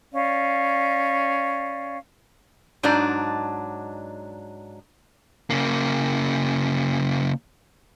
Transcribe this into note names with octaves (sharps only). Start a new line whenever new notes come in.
C#4 D5 F5
G#2 F#3 D4 D#4 D5
C#3 A#3